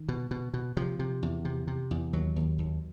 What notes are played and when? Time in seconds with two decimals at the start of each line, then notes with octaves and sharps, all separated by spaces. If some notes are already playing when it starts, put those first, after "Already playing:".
Already playing: D#3
0.08 B2
0.31 B2
0.54 B2
0.77 C3 F3
0.99 C3
1.23 E2
1.45 C3
1.67 C3
1.91 E2
2.13 D#2 F#3
2.36 D#2
2.58 D#2